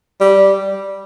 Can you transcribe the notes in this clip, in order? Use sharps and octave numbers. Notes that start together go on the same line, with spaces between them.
G3